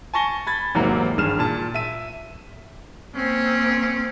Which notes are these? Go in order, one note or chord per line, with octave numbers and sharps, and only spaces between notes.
G#5 A5 C#6 A#6 G7
B5 G#6 A6
E2 G#2 C3 F#3 A#3
G#1 G2 G#4 F6 E7
A#2 A5
E5 D#7
A#3 C4 C#4